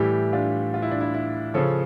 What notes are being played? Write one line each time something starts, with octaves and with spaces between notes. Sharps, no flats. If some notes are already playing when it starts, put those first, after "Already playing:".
Already playing: A2 E3 G3 E4 G4
D4 F4
F4
E4
D4
E4
E4
C#3 F3 A4 C#5